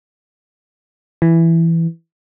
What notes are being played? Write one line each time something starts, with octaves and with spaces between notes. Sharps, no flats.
E3